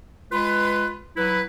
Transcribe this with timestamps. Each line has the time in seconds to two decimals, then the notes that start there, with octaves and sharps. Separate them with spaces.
0.31 G#3 F4 B4
1.17 F#3 E4 B4